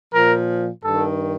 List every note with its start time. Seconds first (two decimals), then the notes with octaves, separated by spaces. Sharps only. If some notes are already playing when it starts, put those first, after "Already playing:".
0.12 A#2 F3 A#4
0.83 G2 D#3 A4